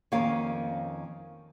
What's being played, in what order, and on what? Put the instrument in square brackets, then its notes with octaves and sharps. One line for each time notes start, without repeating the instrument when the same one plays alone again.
[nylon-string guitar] F2 D#3 A#3 C#4 F5